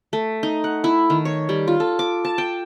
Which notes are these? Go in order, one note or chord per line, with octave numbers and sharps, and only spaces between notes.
A3
D#4
F#5
E4
D#3
C#5
G3
F4
A4
D6
A5
G5